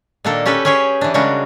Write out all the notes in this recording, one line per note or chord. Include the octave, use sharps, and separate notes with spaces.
A#2 D#3 A#3 D4 A4 A#4
C#4 G4 A4 B4 G5
C#4 G4 G#4 C#5 G5
E3 D4
C#3 G3 G#3 D4 F#4 A#4